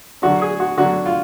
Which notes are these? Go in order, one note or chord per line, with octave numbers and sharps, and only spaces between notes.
D3 F#3 D4 F#4
G#4
F#4
D3 F#3 D4 F#4
F4